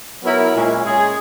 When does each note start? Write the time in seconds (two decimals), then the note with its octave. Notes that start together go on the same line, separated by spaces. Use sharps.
0.23 F#3 B3 E4 A#4
0.53 A#2 G#3 C#4
0.83 G#3 C#4 G#4